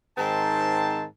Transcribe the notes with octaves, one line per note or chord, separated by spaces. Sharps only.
G#2 D#3 C4 A5